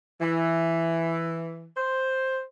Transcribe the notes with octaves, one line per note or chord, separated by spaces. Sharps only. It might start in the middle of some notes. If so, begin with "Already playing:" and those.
E3
C5